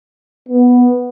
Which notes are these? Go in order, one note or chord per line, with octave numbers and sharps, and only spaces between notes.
B3